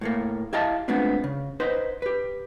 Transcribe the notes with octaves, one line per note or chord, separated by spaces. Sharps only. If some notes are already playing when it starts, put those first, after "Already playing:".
A2 A3 A#3
E4 G4 D#5 F5 A5
G#3 A3 B3 C4 D4 F4
C#3
D#4 B4 C5
G4 B4